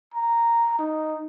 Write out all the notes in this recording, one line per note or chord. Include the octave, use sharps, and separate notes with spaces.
A#5
D#4